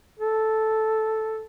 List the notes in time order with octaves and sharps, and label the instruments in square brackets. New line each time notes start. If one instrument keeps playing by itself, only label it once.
[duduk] A4